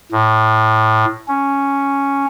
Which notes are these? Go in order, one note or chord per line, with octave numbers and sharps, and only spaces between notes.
A2
C#4